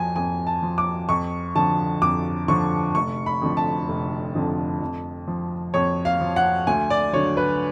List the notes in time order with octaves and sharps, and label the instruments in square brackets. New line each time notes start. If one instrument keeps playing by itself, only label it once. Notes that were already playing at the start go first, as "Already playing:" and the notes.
Already playing: [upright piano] F2 F3 G#5
F2 G#5
A5
F3
D6
F2 C#6
D3 F3 A5
F2 D6
D3 F3 C#6
F1 C#6
B5
F2 D3 F3
A5
F1
F2 D3 F3
F2
F3
F2 C#5
F5
F3
F#5
D2 G#5
D5
D3 F#3 C#5
B4